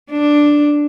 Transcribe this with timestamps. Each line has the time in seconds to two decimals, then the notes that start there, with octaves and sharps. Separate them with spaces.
0.11 D4